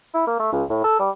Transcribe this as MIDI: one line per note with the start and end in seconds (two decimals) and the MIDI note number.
0.14 0.26 64
0.27 0.39 58
0.40 0.48 57
0.52 0.63 37
0.69 0.81 45
0.84 0.99 69
1.00 1.10 55